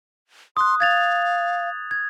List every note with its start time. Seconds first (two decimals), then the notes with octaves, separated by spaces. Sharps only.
0.57 C6 D#6 F#6
0.80 F5 G#6 A6 F7
1.91 G#6